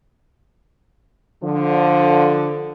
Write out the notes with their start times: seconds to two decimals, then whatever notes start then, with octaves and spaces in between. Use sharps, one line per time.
1.43 D3 F3